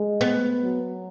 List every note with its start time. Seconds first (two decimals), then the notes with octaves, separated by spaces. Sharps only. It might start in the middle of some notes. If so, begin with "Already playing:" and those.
Already playing: G#3
0.21 B3
0.62 F#3